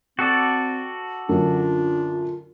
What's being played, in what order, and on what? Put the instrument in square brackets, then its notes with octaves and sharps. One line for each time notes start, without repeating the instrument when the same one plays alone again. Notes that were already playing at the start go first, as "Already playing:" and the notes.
[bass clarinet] C4 [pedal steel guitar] F#4 A4 D5
[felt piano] F#2 D3 [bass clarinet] D4 [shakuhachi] F4